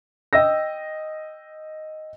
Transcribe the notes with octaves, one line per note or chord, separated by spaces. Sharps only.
D#5 G5 E6 A#6